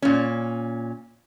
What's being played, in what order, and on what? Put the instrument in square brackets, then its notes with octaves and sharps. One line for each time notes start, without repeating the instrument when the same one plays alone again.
[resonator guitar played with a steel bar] A#2 C#4